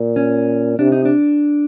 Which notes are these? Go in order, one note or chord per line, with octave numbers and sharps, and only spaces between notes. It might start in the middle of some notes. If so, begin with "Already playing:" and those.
Already playing: A#2
C#4
C3 D4
D#4
D4